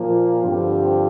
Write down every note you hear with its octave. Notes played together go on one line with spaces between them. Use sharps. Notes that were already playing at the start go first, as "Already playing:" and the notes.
Already playing: A#2 F3 A#3 F4
G2 D3 F3 C4 G4